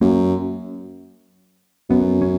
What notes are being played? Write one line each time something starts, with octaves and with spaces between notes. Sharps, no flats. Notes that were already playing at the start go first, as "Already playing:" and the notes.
F#2 A#3
F#2 B3
C#4